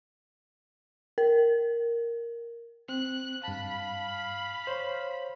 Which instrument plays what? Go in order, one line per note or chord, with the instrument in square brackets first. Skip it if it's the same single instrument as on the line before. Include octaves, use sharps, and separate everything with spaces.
[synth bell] A#4
[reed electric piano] C4 [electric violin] F#6
[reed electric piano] G2 A5 [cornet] F5 [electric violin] B5
[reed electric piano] C5 C#5